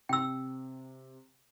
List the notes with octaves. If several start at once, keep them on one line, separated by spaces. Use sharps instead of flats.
C3 G5 E6